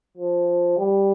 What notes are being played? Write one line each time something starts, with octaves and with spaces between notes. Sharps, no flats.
F3
G3